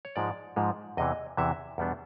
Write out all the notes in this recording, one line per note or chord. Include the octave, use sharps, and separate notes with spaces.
C#5
G#2 F3 G#3 D5
G#2 F3 G#3
E2 C3 E3 D#5
E2 C3 E3 E5
E2 B2 G3 B3 D4